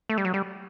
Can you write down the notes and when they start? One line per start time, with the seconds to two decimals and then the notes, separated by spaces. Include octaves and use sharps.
0.09 A3
0.18 G3
0.25 F#3
0.34 G3